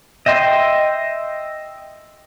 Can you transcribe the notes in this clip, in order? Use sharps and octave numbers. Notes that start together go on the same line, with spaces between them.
D#5 E5 G5 C6